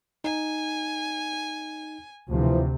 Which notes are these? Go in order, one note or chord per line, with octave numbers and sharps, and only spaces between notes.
D#4 G#5
D2 C3 E3 F3